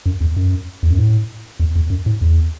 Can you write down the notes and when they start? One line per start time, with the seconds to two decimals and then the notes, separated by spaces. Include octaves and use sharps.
0.06 F#2
0.21 E2
0.37 F#2
0.83 E2
0.90 F#2
0.98 A2
1.60 E2
1.76 E2
1.90 F#2
2.06 A2
2.21 E2